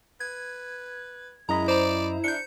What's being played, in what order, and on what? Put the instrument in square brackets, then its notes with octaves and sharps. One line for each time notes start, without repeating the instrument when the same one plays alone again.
[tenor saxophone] B4 [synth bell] G#6
[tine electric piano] F#2 D#5 B5 [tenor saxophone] G#3 [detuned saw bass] E4 [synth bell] A#5
[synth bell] C5 A#5 [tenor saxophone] D5
[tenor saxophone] D4 [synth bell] G6 C#7